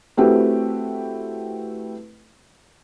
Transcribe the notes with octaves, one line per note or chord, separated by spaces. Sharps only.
A3 C4 E4 F#4 G4 B4